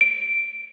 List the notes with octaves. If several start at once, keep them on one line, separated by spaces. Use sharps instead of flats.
D7